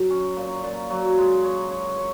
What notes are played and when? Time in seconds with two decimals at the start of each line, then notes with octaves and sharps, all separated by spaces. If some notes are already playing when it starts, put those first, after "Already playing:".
Already playing: F#3
0.10 C#4
0.37 A#2
0.64 A#2
0.90 F#3
1.18 G#3
1.44 C#5
1.71 C#5
1.98 C#5